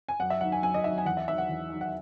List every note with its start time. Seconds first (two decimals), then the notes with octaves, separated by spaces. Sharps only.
0.09 G#5
0.20 F#2 F#5
0.30 E5
0.41 D#3 F#3 F#5
0.52 G#5
0.63 F#2 G#5
0.74 D#5
0.84 D#3 F#3 E5
0.98 G#5
1.05 E2 F#5
1.17 E5
1.28 D#3 F#3 E5
1.38 F#5
1.49 E2
1.70 D#3 F#3
1.81 F#5